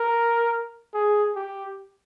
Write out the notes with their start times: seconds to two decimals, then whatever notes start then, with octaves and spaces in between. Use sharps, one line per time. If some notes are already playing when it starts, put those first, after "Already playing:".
Already playing: A#4
0.94 G#4
1.36 G4